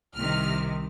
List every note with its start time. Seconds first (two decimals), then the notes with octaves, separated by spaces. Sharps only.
0.15 C2 C3 D#3 F6